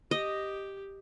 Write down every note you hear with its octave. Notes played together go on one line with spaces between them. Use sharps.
G4 D#5